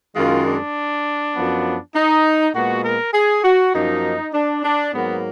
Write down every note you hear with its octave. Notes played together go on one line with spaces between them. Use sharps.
F#2 D#3 G#3 F4
D4
F#2 F3 B3
D#4
A#2 G#3 B3 F#4
A#4
G#4
F#4
F#2 F3 A#3 D#4
D4
D4
G#2 F#3 A#3 B3